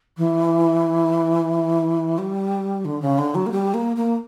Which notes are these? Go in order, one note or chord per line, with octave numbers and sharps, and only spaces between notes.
E3
G3
D3
C#3
D3
F#3
A#3
G3
A#3
A#3